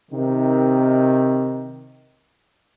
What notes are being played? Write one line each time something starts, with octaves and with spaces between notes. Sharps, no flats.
C3 D#3